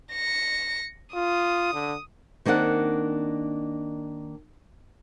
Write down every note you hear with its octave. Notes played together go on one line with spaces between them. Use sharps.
A#6 C#7
F4 D#6
D3
D#3 A#3 C4 D4 F#5